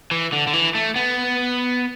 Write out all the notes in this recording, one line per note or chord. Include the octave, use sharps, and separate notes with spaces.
E3
D3
D3
E3
A3
B3